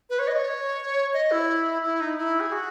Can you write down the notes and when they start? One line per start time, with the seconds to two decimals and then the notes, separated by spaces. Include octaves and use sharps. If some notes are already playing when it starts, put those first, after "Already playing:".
0.10 B4
0.19 C#5
0.27 D#5
0.36 C#5
1.13 D#5
1.31 E4
1.83 E4
2.00 D#4
2.18 E4
2.40 G#4
2.52 F#4